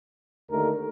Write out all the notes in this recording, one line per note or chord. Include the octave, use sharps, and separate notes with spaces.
D#2 D3 A3 D#4 A#4